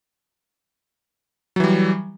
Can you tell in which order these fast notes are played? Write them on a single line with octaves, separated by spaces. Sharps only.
F#3 E3 G3